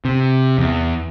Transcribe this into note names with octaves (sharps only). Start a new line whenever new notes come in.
C3
E2